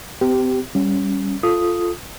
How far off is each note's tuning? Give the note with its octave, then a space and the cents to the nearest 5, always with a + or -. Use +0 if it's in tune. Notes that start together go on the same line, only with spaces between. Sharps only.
C4 -45 G4 -15
G3 +0 C#4 +0
F4 +0 A4 -5 D#6 +0